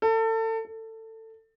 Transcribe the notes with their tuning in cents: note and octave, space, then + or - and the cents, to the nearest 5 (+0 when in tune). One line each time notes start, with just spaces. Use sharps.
A4 +30
A4 +20